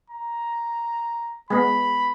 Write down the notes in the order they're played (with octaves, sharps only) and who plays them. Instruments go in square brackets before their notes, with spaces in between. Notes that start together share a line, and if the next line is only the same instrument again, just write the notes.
[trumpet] A#5
[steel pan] G#3 B3 [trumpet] B5